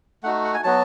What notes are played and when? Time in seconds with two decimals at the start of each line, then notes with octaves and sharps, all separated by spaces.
0.23 A3 D#4 F#4 F#5
0.44 F#5
0.54 G#5
0.64 F#3 B3 F#4 A5